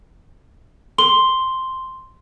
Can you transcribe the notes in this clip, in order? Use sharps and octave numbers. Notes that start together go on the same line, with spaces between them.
C6 G7